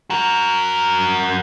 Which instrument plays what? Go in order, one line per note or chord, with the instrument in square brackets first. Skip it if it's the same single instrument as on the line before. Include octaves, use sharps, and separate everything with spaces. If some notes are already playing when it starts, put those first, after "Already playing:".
[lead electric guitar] F#4 A#4